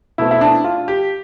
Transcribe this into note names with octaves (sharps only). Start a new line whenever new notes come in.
B2 A3 C4 E4
E4
D4
F4
G4